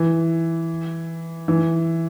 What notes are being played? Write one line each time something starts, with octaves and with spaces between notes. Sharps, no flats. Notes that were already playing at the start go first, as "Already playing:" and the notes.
Already playing: E3
E3